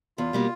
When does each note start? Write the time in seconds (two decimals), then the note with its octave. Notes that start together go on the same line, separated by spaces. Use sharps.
0.18 E2 F4
0.33 B2 G3 A#3